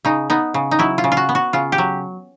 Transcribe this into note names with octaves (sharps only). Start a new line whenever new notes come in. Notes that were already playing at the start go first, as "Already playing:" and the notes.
C#3 D#4
B3 D#4
C#3
D#4
F#3 E4
F4
C#3
F4
F#4
B3
F#4
C#3 F4
G4
F#3